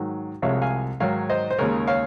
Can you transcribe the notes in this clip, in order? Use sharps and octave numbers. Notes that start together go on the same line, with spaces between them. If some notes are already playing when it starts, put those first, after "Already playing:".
Already playing: G#2 D#3 F#3
C2 C3 F3 G#3 C#5 F5
F5 G#5
G#2 D#3 F#3 C#5 F5
C5 D#5
C5
D#2 C#3 G#3 A#4 C#5
C#5 F5